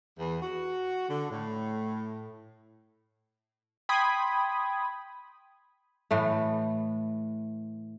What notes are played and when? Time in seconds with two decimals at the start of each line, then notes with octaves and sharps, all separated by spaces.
0.18 E2
0.42 F#4
1.09 D3
1.30 A2
3.89 G5 B5 C6 D#6 G#6
6.11 A2 E3 A3